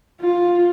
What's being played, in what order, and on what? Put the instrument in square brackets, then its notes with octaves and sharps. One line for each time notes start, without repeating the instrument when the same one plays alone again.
[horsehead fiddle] F4